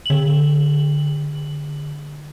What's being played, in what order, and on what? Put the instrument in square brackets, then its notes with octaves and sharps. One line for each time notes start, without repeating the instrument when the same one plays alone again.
[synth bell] D3 F#7